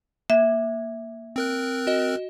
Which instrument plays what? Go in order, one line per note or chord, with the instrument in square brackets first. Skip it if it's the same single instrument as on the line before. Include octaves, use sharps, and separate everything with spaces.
[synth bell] A#3 [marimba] E5
[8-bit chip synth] C4 A#4 F#6
[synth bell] F#4 D#5